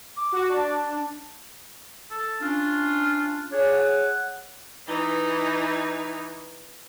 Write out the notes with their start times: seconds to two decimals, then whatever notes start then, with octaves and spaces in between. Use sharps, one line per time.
0.16 D6
0.32 F#4
0.49 D4
2.11 A4
2.42 C#4 D4 F4
3.52 D4 G#4 C#5
3.72 F#5
4.87 E3 D#4